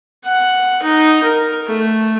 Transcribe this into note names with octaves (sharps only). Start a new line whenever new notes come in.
F#5
D#4
A#4
A3